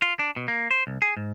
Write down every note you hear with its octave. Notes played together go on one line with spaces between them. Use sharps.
F4
D4
B2
A#3
C5
C2
G#4
G#2